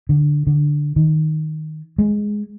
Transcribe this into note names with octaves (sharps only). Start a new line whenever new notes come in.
D3
D3
D#3
G#3